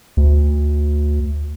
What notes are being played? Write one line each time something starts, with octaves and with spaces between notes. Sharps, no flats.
D2